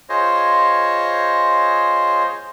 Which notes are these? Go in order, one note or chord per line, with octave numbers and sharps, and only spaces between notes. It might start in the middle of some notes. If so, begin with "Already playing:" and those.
F4 G#4 C5 C#5 D#5